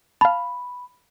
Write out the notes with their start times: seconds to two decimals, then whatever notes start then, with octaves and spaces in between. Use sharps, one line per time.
0.21 F5 A5 B5